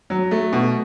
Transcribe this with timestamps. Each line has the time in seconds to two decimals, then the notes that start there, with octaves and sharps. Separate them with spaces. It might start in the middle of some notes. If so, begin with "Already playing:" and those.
0.10 F#3
0.31 A3
0.53 B2